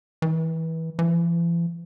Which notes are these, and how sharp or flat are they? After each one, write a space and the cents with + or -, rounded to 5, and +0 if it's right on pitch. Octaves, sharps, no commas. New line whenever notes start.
E3 -25
E3 +45